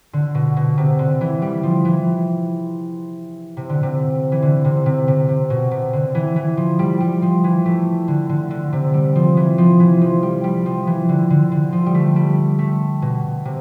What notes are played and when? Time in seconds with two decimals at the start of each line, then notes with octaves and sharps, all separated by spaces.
0.13 D3
0.35 B2
0.57 B2
0.78 C3
0.99 D3
1.21 E3
1.42 G3
1.63 F3
1.85 E3
3.57 C3
3.69 D3
3.83 C3
4.32 E3
4.42 D3
4.65 C3
4.86 C3
5.08 C3
5.29 C3
5.50 B2
5.71 C3
5.93 D3
6.15 E3
6.36 E3
6.57 F3
6.79 G3
7.00 G3
7.22 F3
7.44 E3
7.66 A3
8.08 D3
8.29 D3
8.50 D3
8.73 C3
8.94 G3
9.16 F3
9.37 E3
9.58 F3
9.80 E3
10.02 F3
10.23 G3
10.44 G3
10.66 F3
10.87 E3
11.09 D3
11.30 D3
11.52 D3
11.72 F3
11.86 G3
11.95 A3
12.16 G3
12.59 A3
13.02 B2
13.45 C3